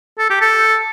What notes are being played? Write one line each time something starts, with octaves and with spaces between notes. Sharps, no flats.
A4
G4
A4